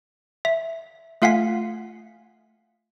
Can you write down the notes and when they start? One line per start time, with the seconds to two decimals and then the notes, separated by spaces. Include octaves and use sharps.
0.45 E5
1.22 A3 F4 F5 F#5 G#5 B6